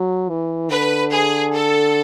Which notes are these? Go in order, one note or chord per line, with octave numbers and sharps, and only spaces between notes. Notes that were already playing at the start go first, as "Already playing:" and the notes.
Already playing: F#3
E3
D3 B4
G#4
A4